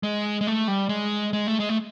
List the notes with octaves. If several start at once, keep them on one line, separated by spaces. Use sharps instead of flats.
G#3
G#3
A3
G3
G#3
G#3
A3
G#3
A3